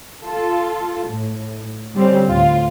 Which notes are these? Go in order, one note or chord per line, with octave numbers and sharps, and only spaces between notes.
F4 A4
A2
D3 G3 C4 C#4 G4
D2 A2 F4